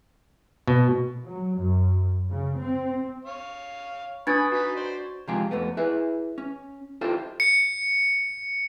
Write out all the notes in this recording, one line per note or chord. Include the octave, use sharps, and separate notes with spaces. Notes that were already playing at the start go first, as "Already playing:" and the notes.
B2
F#3
F#2
C#3
C4
C#5 F5
D4 B4 G#5 B5 C#6 D#6 G#6 A6
D#4 F#4 B4 B6
C5 D5 C6
C3 F3 G#3 F4 G4 G#4
F2 A3 B3
E4 G#4 B4 E5
C#4
E4 F4 G4 A4 C5
C#7